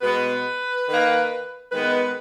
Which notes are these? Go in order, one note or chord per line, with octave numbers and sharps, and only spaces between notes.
B2 G#3 B3 B4
D#3 A#3
D#3 G#3 B3 B4